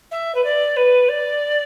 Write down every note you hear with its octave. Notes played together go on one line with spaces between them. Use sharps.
E5
B4
D5
B4
D5